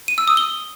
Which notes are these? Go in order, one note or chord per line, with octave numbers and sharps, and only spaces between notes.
D#7
E6
D#6
G7